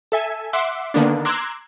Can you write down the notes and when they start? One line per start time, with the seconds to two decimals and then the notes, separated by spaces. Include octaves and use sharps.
0.12 A4 E5 G#5
0.53 E5 F#5 C6 D6
0.94 D3 D#3 A#3 B3 D4
1.25 A#5 C6 D6 E6 F#6 G#6